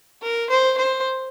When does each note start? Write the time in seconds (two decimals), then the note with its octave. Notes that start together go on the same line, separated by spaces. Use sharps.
0.23 A#4
0.50 C5
0.78 C5